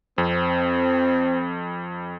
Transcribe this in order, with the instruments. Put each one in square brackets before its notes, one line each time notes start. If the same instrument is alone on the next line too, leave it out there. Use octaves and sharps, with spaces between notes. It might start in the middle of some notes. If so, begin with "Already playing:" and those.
[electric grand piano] F2 [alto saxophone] C4